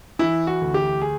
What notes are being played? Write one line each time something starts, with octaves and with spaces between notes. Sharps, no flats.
E3 E4
F#4
D2
G4
G#4